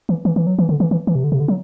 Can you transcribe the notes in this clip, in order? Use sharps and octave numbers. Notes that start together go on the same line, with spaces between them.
E3
E3
E3
F#3
E3
D3
E3
E3
E3
C3
D3
C3
D3
F#3